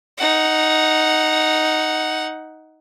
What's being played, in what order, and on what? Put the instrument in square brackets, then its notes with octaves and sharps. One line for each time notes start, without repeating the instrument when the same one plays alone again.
[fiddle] D#4 F#5